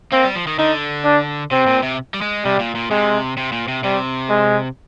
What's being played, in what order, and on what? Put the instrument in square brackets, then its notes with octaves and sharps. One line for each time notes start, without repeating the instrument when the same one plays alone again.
[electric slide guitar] A#3 [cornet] C4
[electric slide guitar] G3
F3
D#3
[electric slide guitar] D3 [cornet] D#4
[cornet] D4
[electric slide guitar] C3 [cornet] C4
[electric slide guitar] A#2
C3
G3
G#3
[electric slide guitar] C3 [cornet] G3
[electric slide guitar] A#2
A#2
[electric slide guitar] C3 [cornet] G#3
[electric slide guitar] C3
A#2
C3
[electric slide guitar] C3 [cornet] G3
[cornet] G#3